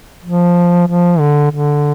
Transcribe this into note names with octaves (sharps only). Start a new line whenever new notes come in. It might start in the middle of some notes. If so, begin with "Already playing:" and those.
F3
F3
D3
D3